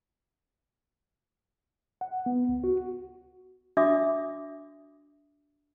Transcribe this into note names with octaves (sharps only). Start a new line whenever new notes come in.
F#5
B3
C#2
F#4
D4 F#4 E5 D6 D#6